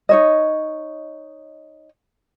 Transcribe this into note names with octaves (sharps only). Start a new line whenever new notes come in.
D#4 C#5 D#5